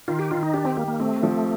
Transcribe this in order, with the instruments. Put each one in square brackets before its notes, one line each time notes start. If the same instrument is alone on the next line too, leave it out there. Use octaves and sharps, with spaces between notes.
[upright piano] D#3 [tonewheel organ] F4
[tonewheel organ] G4
[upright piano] D#3 [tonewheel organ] F4
[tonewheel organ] D#4
[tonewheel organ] D4 [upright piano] G4
[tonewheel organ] C4
[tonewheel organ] A#3 [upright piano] G4
[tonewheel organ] A#3
[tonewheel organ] A3 [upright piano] C4
[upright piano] F3